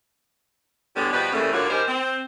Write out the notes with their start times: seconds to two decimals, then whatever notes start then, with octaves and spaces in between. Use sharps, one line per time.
0.95 A2 D3 G3 G#3 B3
1.12 B2 F3 G3 B3 B4
1.32 A2 C#3 E3 G3 A3 A#3
1.52 A2 D3 F#3 A#3 F4 F#4
1.69 D#3 G3 C#4 A#4 C5
1.87 C4